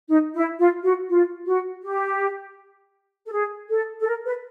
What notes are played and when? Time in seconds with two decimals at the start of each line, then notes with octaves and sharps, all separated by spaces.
0.09 D#4
0.34 E4
0.59 F4
0.84 F#4
1.09 F4
1.46 F#4
1.83 G4
3.26 A4
3.32 G#4
3.70 A4
4.01 A4
4.08 A#4
4.26 B4